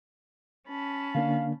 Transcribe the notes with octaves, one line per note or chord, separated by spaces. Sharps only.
C#4 A5 B5
D3 A#3 D4 F5